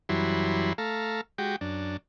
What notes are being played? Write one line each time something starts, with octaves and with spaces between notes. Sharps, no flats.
F#2 E3 F#3 G3 E4 C6
A3 A4 F5 A#5
G#3 F#4 G4 G5
F#2 D4